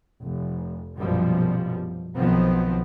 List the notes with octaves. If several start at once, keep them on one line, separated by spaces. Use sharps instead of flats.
F1
A#1 F#2 B2 F3 G3
B1 D#3 F3 B3 C4